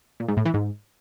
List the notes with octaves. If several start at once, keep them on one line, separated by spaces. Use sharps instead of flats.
A#2
G#2
A2
E3
G#2